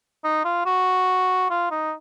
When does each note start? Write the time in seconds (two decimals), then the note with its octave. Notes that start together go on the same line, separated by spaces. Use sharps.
0.24 D#4
0.45 F4
0.66 F#4
1.50 F4
1.71 D#4